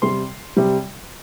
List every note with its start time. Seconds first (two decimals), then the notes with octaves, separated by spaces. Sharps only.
0.02 C3 G3 C6
0.57 C3 G3